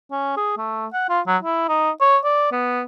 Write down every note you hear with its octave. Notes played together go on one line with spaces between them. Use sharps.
C#4
G#4
A3
F#5
F4
F#3
E4
D#4
C#5
D5
B3